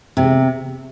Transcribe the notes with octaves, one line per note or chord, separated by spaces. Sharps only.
C3